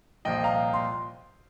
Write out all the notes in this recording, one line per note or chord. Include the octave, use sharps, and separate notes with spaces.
C2 A#2 F3 D#5 G5
F5 A#5
C6